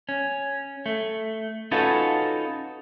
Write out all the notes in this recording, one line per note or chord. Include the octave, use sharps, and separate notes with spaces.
C#4
A3
C#4 D#4 F4 F#4 A4 B4